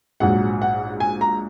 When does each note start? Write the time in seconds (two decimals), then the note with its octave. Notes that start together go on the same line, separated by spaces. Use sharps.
0.20 A#1 G#2 F#3 F#5
0.62 F#5
1.00 G#5
1.21 A#5